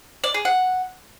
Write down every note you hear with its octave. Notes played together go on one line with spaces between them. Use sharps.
D5
G#4
F#5